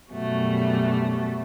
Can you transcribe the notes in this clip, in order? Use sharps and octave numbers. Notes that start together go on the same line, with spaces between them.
F#2 B2 G3 A3 F#4